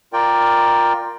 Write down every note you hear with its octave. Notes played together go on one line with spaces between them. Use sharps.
F4 A#4 D5 G5